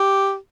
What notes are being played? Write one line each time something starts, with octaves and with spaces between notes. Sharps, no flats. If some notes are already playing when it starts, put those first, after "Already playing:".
Already playing: G4